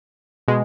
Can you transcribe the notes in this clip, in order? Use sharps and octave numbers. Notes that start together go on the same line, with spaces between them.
B2 G#3